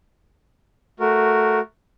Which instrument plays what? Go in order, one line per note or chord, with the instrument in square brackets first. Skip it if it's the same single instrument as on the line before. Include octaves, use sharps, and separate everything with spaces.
[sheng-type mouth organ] A3 F#4 A#4